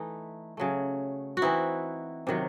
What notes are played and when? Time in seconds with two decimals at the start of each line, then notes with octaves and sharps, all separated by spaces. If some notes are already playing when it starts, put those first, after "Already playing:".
Already playing: E3 A3 D#4
0.57 C#3 F#3 A3
1.37 F#4
1.42 E3 C4 D#4 E4
2.27 C3 D#3 F#3